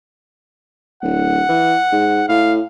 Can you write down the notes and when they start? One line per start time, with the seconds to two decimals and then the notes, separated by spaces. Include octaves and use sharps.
1.03 D1 F#5
1.49 E3
1.92 G#2
2.28 A2 F5